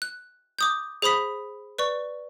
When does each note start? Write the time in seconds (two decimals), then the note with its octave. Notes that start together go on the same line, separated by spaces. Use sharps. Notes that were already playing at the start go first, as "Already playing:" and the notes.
0.02 F#6
0.59 D6 D#6 G6
1.02 G#4 C5 B5 D#6 B6
1.79 B4 D5 C#6